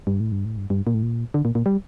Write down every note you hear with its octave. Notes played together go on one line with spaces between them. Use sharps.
G2
A2
G2
A2
G2
G2
A#2
A2
A#2
D3
A#2
A#2
G3